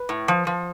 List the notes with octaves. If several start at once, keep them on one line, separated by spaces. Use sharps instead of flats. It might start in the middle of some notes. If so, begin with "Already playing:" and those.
Already playing: B4
A2
F3
F3